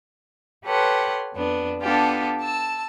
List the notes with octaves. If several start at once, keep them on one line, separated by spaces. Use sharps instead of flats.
G4 A4 B4 C#5 F#5 C6
F2 B3 D4
B3 D4 F4 G4 A4
A5 E6